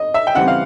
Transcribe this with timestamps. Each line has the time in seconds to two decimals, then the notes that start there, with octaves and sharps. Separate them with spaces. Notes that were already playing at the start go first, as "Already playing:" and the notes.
Already playing: D#5
0.14 E5
0.27 G5
0.35 C#3 E3 G3 C4 F#5
0.48 F5